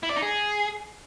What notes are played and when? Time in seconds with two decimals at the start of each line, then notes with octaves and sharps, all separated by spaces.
0.03 E4
0.09 D5
0.16 D#4
0.22 G#4